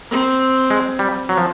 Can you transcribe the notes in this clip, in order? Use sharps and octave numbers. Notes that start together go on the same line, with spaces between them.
C4
G#3
G3
F#3
F3